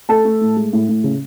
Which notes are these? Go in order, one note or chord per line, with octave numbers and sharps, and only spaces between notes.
A3 A4 A5
A3
A2
G#3
A2
A2
C#3